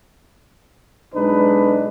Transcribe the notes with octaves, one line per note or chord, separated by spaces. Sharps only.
B1 G#3 D4 D#4 B4